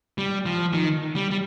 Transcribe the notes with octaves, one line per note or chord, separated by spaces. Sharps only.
G3
F3
D#3
G3
G3